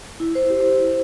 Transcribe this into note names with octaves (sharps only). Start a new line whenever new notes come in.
E4
C5
G4